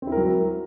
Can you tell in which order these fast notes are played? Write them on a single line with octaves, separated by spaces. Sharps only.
C4 E4 A#4 F#3